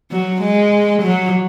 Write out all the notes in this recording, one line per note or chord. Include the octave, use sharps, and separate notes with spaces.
F#3
G#3
F#3